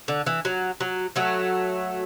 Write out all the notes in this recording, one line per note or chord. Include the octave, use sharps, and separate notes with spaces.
D3
E3
F#3
F#3
F#3 A3